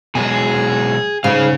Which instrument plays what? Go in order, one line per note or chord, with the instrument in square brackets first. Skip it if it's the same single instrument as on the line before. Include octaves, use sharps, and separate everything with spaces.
[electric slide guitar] B2 F#3 G#3 [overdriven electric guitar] G#4
[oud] G#2 [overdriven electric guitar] C#3 [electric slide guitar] G#4 F5